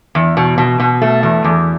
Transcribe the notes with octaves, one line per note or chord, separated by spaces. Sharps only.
E2
B2
B2
B2
A3
E2
E2